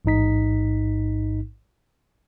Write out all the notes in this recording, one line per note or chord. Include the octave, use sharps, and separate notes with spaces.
A1 G#2 D#4 B6